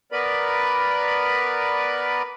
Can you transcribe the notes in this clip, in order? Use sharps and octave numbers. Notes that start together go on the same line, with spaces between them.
B3 A#4 B4 D5 B5